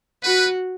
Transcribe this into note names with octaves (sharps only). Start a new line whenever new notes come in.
F#4 B4